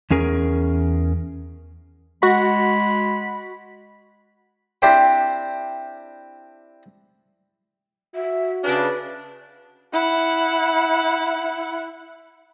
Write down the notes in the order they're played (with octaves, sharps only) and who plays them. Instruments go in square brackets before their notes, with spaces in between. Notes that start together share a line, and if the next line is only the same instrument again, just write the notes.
[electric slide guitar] E2 C#4 G#4 A#4
[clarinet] G#3 [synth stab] F#4 [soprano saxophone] B5
[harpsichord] C4 D4 E4 G4 C5 G5
[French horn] F#4 [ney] E5
[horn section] C#3 D4 [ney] B4
[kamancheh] E4 F#5